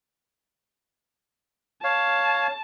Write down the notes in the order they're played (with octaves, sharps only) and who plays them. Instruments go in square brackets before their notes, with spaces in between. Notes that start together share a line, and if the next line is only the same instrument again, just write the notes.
[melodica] C#5 F5 [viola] A5